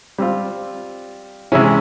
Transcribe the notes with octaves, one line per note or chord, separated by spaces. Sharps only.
G3 C4 F4
C3 E3 G#3 C#4 E4